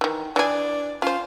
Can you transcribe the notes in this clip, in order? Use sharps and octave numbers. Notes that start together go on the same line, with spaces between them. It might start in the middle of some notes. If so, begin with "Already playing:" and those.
D#3 E3
E3 D4 G#4
C#4 F4 C5